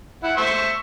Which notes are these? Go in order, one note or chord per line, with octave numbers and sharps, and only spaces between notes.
E4 F#5
C5 E5 C#6